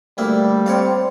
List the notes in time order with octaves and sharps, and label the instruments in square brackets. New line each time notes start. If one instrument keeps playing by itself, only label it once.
[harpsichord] D2 A#3 E4 [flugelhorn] G3
[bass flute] C4 [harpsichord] C#5 D5 F5